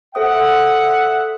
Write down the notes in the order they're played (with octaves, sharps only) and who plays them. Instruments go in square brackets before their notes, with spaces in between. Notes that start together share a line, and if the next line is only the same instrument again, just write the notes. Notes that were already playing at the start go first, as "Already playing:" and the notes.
[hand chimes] A4 C5 D#6 [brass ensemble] E5 F#5